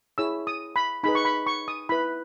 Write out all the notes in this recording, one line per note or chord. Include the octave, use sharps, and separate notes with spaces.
E4 G#4 C#5 E6
D#6
B5
D#4 G#4 B4 B5
C#6
B5
C#6
D#6
E4 B4 B5